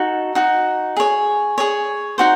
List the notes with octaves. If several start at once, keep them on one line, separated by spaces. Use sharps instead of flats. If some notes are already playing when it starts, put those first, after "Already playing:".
Already playing: D#4 F#4 A4
D#4 F#4
G#4 C#5
G#4 C#5
D#4 F#4 C5